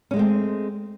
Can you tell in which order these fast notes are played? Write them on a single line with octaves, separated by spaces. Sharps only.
C#4 G#3 A3 C4